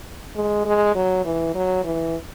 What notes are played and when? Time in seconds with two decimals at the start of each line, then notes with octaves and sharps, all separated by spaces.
0.36 G#3
0.65 G#3
0.95 F#3
1.25 E3
1.55 F#3
1.85 E3